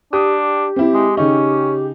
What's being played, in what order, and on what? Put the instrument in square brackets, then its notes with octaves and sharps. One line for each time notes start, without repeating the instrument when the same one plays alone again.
[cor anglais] D4 [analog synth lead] G4 [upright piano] D#6
[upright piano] C4 E4
[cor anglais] G#3
[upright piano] C#3 D#4 [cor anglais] C#4